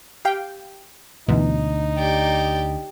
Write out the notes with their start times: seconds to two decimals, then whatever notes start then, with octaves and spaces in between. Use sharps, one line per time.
0.25 G4 F5 G5
1.28 D2 G#2 B2 E3 D#4
1.98 G4 D5